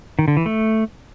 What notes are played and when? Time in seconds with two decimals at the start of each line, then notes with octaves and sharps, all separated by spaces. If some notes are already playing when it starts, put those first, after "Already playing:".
0.19 D#3
0.28 D3
0.37 E3
0.46 A3